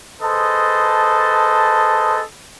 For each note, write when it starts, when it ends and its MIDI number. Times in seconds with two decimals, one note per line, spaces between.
0.22 2.22 68
0.22 2.22 69
0.22 2.22 71
0.22 2.22 72
0.22 2.22 75
0.22 2.22 81